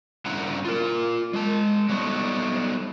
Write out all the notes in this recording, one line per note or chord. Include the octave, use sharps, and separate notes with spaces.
G2 C#3 E4 F#5 A#5
F4 A#4
G#3 A5
F#3 G3 A3 B3 D4 D#4